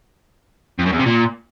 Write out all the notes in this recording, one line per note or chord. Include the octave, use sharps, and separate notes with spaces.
F2
F#2
E2
C3
A#2